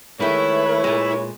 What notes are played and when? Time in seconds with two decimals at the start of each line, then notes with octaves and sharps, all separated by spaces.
0.20 D#3 G#3 A3 E4 B4 C#5
0.84 A#2 G#3